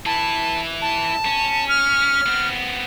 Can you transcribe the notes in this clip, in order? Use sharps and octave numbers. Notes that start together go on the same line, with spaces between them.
E4 B4 A5
A5
C#4
F6
B3 C4